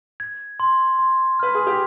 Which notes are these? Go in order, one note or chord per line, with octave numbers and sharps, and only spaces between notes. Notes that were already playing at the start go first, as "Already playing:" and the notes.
G#6
C6
C6
B4 F6
G#4
G4